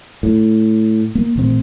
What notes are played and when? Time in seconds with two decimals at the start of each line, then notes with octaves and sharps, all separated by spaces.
0.23 A2
1.15 A#3
1.36 A1 A#2 C4